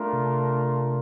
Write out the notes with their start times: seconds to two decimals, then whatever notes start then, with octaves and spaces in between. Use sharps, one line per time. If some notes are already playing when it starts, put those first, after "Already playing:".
Already playing: A3 D4 F4 A#4
0.13 C3